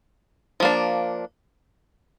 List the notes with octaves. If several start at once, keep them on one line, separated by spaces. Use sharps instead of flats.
F3 A#3 D4